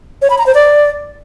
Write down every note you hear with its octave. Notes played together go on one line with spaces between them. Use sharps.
C#5
B5
A#5
C5
D5